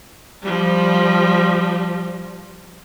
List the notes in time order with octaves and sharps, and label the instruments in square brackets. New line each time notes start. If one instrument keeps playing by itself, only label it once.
[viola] F3 G3